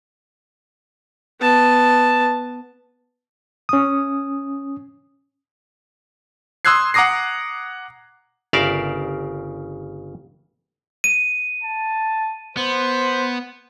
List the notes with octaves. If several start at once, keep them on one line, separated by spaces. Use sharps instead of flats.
B3 A5
C#4 D#6
C6 D#6 E6 F#6 G#6 C7
F#5 A#5 D6 D#6 A#6 C7
G1 C#3 A#4 D5 E5 F5
D#7
A5
B3 C5